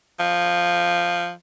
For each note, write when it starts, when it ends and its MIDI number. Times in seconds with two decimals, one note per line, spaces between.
0.20 1.31 53